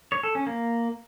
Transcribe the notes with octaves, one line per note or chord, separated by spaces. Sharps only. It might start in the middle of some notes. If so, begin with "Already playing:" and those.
C#5
A4
C#4
A#3